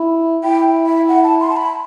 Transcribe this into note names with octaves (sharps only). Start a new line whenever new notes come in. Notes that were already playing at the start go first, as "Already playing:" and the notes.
Already playing: E4
E4 G5
E5
F#5
A5
C6
A5
B5